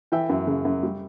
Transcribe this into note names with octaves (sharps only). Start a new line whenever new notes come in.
E3 E5 G5
F#2
C#3
F#2
G3